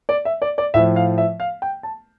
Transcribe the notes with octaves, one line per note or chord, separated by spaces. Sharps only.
D5
E5
D5
D5
A2 F3 E5
F5
E5
F5
G5
A5